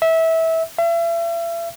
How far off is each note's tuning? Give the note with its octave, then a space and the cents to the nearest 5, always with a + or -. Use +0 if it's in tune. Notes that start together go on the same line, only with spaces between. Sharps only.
E5 -20
E5 +40